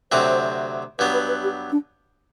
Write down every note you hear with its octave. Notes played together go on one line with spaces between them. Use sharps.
D2 C3 F#3 C4 C5
G2 F#3 B3 B4
B4
B4
G4
D4